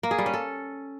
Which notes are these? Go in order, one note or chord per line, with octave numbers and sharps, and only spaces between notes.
A#3
G#4
G3
C#4
A4